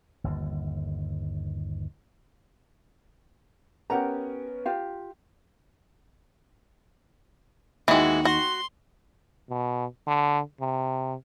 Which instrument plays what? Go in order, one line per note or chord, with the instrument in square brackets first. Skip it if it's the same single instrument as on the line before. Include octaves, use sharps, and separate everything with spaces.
[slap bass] G1 D#2
[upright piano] B3 C#4 A#4 [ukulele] G4 F#5 A#5
[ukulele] F4 G4 F5
[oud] D#2 [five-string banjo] E3 G#3 [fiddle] F#4
[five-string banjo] F#4 [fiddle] C6
[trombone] B2
D3
C3